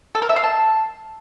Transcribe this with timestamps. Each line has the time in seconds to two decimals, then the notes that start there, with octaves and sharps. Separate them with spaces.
0.15 A4
0.22 A#4
0.29 E5
0.36 F5
0.43 A5